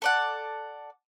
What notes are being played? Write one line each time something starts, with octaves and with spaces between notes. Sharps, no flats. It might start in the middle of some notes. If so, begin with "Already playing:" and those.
A4 D5 F#5